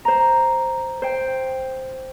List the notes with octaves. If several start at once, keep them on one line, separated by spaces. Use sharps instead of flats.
C5 A#5
C5 G5